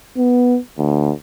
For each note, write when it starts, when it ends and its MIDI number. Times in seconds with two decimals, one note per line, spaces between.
0.17 0.58 59
0.77 1.11 38